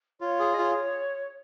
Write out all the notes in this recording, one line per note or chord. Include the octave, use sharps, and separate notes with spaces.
F4 C#5
G#4
D#5
F4 C#5